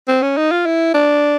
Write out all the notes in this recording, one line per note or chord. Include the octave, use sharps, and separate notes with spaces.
C4
C#4
D#4
F4
E4
D4